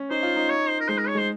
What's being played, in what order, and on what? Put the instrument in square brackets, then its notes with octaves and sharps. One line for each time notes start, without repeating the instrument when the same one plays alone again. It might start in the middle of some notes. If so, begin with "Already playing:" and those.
Already playing: [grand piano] C#4
[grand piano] D#4 [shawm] C5
[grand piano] F4
D#4
[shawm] C#5
C5
A#4
[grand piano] G#3 [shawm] C5
[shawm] A#4
C#5
[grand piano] G#3 [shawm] C5